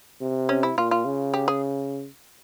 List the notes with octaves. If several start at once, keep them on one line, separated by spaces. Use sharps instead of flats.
C3
C#4
E4
A#2 F4
F4
C#3
G4
G#4